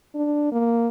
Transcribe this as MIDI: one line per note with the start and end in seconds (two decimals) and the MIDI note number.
0.14 0.48 62
0.52 0.89 58